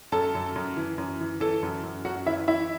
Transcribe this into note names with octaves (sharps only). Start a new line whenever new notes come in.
F#2 A4 A5
F#2
F#2
E3
F#2
E3
E3 A4 A5
F#2
F#2
F#2 F#4 F#5
E3 E4 E5
E3 E4 E5